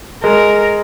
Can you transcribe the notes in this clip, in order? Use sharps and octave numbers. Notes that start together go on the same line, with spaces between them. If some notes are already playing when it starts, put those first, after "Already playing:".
G#3 A#4